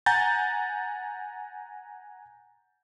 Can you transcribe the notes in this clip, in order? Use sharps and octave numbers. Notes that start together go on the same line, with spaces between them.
F#5 G#5 A#5 G6 A6